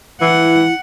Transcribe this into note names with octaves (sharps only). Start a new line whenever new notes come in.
E3 E4 F#5